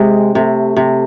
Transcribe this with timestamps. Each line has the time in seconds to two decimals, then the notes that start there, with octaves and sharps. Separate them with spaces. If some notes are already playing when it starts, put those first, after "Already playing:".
Already playing: C3 G#3 C4
0.34 C3 A3
0.77 C3